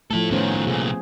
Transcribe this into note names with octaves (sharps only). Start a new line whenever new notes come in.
F3 A3 E4 A4
A2 D#3 B3 C#4 C5
A3
C2 A#2 G#4